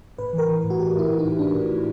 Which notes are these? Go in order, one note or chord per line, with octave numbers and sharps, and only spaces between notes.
A2 B4
E3
A#4
E3
A2
F#4
A2 G4
A2 E4
A2
D#4
A2
A2 D4
A2
A2